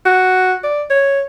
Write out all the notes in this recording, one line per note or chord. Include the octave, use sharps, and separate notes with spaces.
F#4
D5
C#5